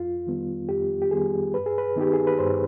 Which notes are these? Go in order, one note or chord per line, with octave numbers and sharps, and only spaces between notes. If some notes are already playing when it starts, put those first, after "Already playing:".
Already playing: F2 F4
D#3 G3 B3
F2 G4
G4
D#3 G3 B3 G#4
G2 B4
G#4
B4
D#3 B3 D#4 G4
G#4
B4
G2 C5